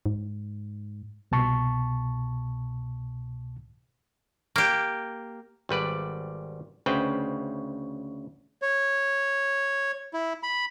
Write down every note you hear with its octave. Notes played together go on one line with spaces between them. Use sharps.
G#2
C2 B2 A5 C#6
A#3 G4
G#1 G3 B4 D5
D2 C#3 B4 C5 G5
C#5
E4
B5